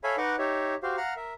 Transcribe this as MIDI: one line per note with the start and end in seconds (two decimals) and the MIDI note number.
0.04 0.16 69
0.04 0.16 73
0.04 0.16 76
0.04 0.16 77
0.04 0.16 80
0.04 0.16 83
0.18 0.36 63
0.18 0.36 71
0.18 0.36 75
0.18 0.36 78
0.18 0.36 85
0.18 0.36 86
0.39 0.75 63
0.39 0.75 67
0.39 0.75 73
0.39 0.75 76
0.83 0.96 66
0.83 0.96 67
0.83 0.96 72
0.83 0.96 77
0.97 1.14 77
0.97 1.14 78
0.97 1.14 82
0.97 1.14 89
1.16 1.33 70
1.16 1.33 76